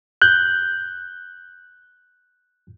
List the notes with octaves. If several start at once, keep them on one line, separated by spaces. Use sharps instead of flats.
F#6 G6